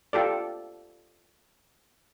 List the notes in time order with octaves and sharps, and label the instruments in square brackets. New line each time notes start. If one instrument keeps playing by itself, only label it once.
[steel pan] F4 G4 A4 D5